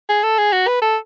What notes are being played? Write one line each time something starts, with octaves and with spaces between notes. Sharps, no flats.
G#4
A4
G#4
F#4
B4
A4